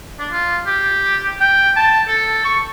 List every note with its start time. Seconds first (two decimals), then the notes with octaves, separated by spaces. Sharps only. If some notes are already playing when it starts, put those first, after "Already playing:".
0.19 D4
0.32 F4
0.66 G4
1.41 G5
1.76 A5
2.08 A4
2.45 C#6